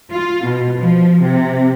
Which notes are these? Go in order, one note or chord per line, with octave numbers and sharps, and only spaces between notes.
F4
B2
F3
C3